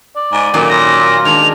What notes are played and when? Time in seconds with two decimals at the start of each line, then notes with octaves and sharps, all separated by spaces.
0.16 D5
0.32 G#2
0.54 A#2 D#3 F#3 C#4
0.69 F4 A#6
1.25 D#3 G#3 D4 F7